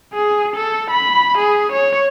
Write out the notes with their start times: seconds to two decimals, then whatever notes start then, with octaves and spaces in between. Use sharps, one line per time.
0.14 G#4
0.56 A4
0.91 B5
1.38 G#4
1.72 C#5